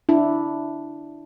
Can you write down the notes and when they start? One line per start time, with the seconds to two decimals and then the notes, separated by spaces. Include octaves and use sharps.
0.09 D4 E4